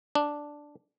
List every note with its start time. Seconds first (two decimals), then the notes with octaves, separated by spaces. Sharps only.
0.15 D4